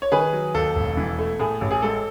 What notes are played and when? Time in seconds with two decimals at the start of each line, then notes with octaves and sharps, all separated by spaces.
0.02 C#5
0.12 D#3 G#4 B4
0.33 F#3
0.54 D#2 A4
0.75 E1
0.97 E3
1.19 A3
1.39 A2 G#4
1.61 A1
1.71 G#4
1.82 G#3 A4